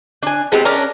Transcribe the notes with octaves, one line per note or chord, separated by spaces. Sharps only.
D4 G#5
G#3 B3 C4 G4
C#4 D4 A#4